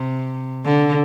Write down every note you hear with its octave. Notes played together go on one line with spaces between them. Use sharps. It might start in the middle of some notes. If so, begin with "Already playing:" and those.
Already playing: C3
D3